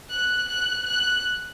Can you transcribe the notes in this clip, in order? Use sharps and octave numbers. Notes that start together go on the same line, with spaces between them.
F#6
F#6
F#6